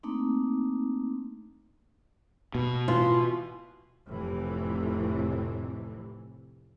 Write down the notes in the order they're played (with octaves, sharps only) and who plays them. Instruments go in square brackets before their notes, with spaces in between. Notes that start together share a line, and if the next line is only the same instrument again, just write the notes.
[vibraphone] A3 A#3 C4 D4 D#4
[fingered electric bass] B2
[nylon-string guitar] E3 F4
[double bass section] F1 A2 C3 E3